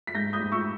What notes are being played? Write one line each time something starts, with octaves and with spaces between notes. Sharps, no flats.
B6
G#2 G6 A#6
D#6 G6
G#2
C#6 E6